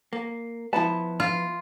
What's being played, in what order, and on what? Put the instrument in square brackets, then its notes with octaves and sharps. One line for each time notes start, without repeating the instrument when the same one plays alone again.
[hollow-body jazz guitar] A#3
[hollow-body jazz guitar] F3 B3 B4 [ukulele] E4 A5
[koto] F4